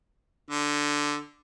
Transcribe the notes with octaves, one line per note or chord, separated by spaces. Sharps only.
D3